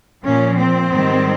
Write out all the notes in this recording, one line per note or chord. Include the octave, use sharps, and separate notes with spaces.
A#2 F3 C#4
C4
G#2 D#3 G3